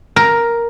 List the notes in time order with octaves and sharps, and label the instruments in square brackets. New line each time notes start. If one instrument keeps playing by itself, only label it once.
[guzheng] A#4